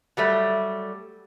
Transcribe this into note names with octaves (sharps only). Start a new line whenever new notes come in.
F#3 G3 A3